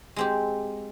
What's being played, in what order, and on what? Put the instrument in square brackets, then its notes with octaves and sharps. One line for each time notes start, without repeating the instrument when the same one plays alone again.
[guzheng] G#3 C4 G4